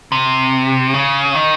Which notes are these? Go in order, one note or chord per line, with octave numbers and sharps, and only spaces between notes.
C3
C#3
D#3